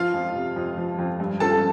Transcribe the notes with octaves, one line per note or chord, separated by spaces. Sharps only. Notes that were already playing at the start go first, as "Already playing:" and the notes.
Already playing: F3 F4 F5
F2
C3
F2
F3
F2
G2
F3 A4 A5